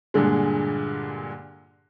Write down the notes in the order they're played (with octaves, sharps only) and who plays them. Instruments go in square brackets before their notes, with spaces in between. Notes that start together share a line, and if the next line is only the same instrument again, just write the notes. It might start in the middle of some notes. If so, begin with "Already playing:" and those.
[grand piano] G2 A#2 D3 G#3